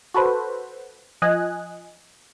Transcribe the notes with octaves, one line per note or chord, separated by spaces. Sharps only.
F#4 A4 B4 C5
F3 D#5 G#5 F#6